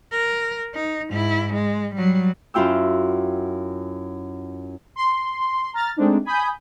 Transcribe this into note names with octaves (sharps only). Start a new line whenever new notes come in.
A#4
D#4
G#2 E4
G#3
F#3 G3
F#2 E4 F4 G5 E6
C6
A#5 F6 A6
G#3 A3 C4 D4 D#4
G#5 B5 D#6 G6